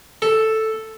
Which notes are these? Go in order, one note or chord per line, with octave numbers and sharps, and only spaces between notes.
A4